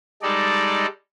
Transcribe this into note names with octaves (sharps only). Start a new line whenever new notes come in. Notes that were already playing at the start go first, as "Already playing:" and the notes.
G3 G#3 D#4 A4 D5